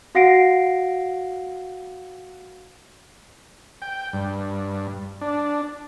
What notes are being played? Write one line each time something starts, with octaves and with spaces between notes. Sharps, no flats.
F#4 F5 F#5 A#6 C7 D7
G5
G2
D4